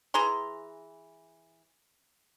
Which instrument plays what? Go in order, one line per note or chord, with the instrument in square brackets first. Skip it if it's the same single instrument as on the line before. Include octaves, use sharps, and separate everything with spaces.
[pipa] E3 G#4 A#5 C6